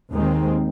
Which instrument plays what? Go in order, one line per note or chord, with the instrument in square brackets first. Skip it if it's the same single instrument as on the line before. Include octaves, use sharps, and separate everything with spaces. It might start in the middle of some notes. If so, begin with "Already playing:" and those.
[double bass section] D#2 D#3 G#3 C4